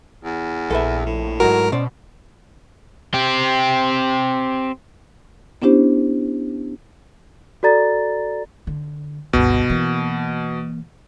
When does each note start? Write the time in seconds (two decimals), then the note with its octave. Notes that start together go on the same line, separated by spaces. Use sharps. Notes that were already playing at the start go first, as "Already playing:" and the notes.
0.24 E2
0.70 A#1 A4 B4 E5
1.06 A2
1.40 G#2 F#3 F#4 A#4
1.72 B2 C#4 C5 D5
3.14 C4 G4
5.62 B3 C#4 D4 E4 G4 C5
7.63 F#4 A4 D5 A#5 A6
8.67 D3
9.33 G1 C#2 B2
9.70 E3 A#3